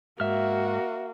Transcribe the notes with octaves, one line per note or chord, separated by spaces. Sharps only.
G#2 A#3 F#4 E5 F6